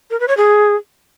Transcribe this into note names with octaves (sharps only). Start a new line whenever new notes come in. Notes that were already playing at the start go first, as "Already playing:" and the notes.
A#4
B4
C#5
G#4